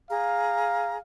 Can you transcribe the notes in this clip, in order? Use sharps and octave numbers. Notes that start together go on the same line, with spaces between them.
G#4 F5 A#5